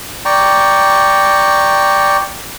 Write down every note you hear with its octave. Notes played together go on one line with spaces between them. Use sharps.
D5 G5 A#5 C#6